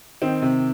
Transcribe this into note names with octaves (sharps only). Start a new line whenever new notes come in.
D#3 C4
C3